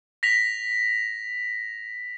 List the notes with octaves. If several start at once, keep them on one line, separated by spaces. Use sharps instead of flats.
A#6 B6 F7